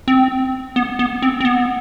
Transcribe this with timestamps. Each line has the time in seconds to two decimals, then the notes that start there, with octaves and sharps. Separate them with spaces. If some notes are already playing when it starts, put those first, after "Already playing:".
0.08 C4
0.76 B3
0.99 B3
1.22 C4
1.41 C4
1.45 B3